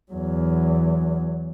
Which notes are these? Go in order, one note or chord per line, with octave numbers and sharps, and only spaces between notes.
E2 F#3